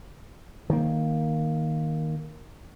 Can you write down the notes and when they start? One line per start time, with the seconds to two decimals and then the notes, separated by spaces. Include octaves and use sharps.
0.70 D#3 A#3